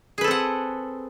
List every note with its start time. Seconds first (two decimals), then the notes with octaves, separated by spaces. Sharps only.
0.18 G#4
0.21 B4
0.24 A4
0.28 C4
0.31 F#5